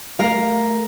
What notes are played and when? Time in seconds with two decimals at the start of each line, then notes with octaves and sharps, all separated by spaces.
0.19 A3 A#4 F5